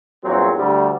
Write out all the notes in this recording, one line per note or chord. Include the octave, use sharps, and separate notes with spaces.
E2 G2 A#2 F#3 C4
D2 G3